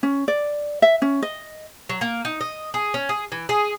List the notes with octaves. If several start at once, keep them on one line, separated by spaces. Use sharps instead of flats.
C#4
D5
E5
C#4
D#5
F#3
A#3
D#4
D#5
G#4
C#4
G#4
E3
G#4